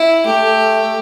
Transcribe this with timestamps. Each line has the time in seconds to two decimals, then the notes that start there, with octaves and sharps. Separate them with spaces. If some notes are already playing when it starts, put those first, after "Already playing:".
Already playing: E4
0.26 A3 G4